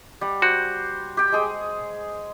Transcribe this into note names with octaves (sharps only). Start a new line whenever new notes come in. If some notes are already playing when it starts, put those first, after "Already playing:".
G3 F#5
F#4 C5
G4 G5
G#3 G#4